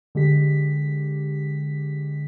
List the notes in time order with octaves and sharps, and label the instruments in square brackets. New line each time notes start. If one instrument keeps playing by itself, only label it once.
[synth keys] D3 G#3 G4 B6